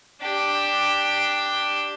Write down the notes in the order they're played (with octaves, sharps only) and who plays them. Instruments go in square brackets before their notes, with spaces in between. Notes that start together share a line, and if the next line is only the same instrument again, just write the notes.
[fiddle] D4 G4